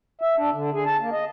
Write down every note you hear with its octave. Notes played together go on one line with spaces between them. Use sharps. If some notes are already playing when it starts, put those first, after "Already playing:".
E5
D4
D3
G#4
A5
A#3
D#5